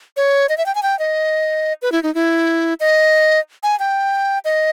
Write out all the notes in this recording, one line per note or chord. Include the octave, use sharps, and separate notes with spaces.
C#5
D#5
E5
G5
G#5
G5
D#5
B4
E4
D#4
E4
D#5
G#5
G5
D#5